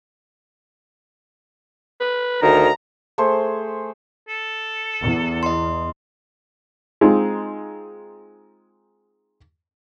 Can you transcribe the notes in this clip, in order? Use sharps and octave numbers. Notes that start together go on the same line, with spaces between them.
B4
D2 D#3 A#5
A3 G#4 C5
A4
E2
D#5 C6
G#3 C4 D#4 F4